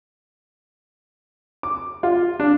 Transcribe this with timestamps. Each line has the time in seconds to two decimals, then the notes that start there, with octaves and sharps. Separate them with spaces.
1.63 D6
2.03 F4
2.40 D4